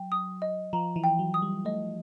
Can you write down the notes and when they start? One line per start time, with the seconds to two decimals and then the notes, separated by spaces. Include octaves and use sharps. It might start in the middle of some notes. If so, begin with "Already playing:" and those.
Already playing: F#3 G5
0.12 D#6
0.42 D#5
0.73 F3 A#5
0.96 E3
1.04 G5
1.19 F#3
1.34 D#6
1.42 G3
1.65 A3 D#5